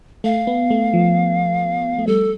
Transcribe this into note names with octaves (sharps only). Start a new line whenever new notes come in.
A3 F5
B3
A3
F3
A3
G3 A4